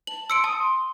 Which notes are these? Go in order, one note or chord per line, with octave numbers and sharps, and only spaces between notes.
A5 F#7
C6 E6 C#7 D7
A5 D#6
C6